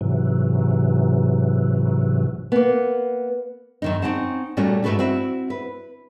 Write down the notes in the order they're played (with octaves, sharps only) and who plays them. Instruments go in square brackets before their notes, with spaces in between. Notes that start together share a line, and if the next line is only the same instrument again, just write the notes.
[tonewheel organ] G#2 C3 E3 F#3
[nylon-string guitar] A#3 B3
F#2 D#3 D#4
C4 C#4 D#4 F#5 A5
A#2 G3 A3 C#4 F#4
G#2 C#3 A3 F#4 A4 B4
C4 E4 F#4
B4